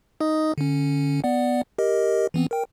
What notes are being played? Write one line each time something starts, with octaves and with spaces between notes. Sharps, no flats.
D#4 D#5 D#6
D3 C#4
B3 D5 F#5
G4 A#4 D#5
E3 B3 C4
A#4 G5